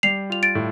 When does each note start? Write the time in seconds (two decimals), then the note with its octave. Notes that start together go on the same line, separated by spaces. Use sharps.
0.03 G3 C7 F7
0.30 F4 F7
0.43 A6 D7
0.55 A2